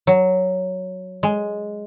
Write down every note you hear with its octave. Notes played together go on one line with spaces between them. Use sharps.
F#3
G#3